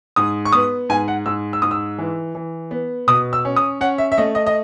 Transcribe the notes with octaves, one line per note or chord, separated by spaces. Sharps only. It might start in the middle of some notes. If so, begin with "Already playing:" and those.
G#2 D#6
C#6
B3 D#6
G#2 G#5
F#5
G#2 E6
E6
G#2 D#6
E6
E3
E3
B3
B2 D#6
E6
C#4
D#6
C#4 F#5
E5
E5
A3 D#5
D#5
D#5